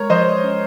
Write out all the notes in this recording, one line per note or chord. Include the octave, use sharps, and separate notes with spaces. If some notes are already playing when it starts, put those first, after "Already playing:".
Already playing: G#3 A#4 C#5
F3 C5 D#5
C#4